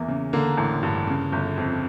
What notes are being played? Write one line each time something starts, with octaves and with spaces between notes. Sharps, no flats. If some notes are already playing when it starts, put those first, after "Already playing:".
Already playing: E2 E3 A#3
C#3
D3 A#3
A1
G2
C#3
G1
F2